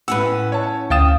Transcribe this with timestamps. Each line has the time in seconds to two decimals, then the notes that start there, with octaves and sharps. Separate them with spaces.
0.08 A2 C#4 B4 F#5 E6
0.52 C#5 A5
0.90 D2 F5 G5 D#6 A6 E7